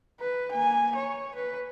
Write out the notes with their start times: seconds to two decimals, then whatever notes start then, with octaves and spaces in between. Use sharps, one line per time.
0.20 B4
0.51 A#3 G#5
0.96 C#5
1.35 B4